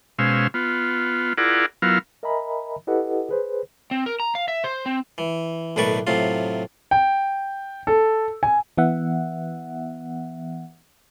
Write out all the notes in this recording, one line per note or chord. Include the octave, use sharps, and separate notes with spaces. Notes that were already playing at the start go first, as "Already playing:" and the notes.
B2 G#3 C#4 C5 F5 E6
B3 F4
E4 F4 G#4 A#4 D5 F#5
F#3 B3 E4 F4 A#4 F5
A#4 D#5 E5 G#5 A#5 B5
E4 G4 A4 B4 D#5 F#5
G#4 B4 C5
C4
A#4
A#5
F5
E5
C5
C4
E3
B1 A2 D#3 B4 D5 C#6
A2 C3 F#3 F4
G5
A4
G#5
E3 B3 E5 F#5